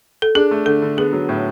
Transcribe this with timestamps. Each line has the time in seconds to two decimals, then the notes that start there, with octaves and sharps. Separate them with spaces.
0.22 A4
0.35 D4 G#4
0.51 A3
0.66 D3 A4
0.82 D3
0.97 B3 G#4
1.13 F#3
1.29 A2